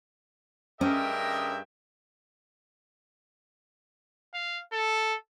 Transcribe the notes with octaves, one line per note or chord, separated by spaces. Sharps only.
G2 C#4 G#4 A#4 D#5 E5 G5
F5
A4